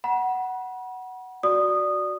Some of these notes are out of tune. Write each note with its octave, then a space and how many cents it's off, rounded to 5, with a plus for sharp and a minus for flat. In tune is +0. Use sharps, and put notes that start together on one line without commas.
F#5 +10 B5 -40
F#4 +0 D5 +0 D#6 -15